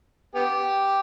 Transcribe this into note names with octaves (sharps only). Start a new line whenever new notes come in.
B3 G4